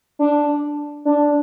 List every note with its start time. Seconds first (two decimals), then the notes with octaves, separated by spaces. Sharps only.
0.19 D4
1.05 D4